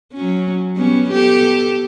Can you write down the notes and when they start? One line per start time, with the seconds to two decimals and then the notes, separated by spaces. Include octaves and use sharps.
0.13 F#3 C#4
0.76 G3 B3 C#4
1.09 B3 G4 A4